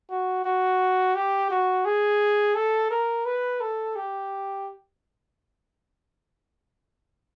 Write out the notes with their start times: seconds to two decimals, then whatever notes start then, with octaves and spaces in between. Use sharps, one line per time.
0.10 F#4
0.44 F#4
1.15 G4
1.50 F#4
1.85 G#4
2.55 A4
2.90 A#4
3.25 B4
3.60 A4
3.96 G4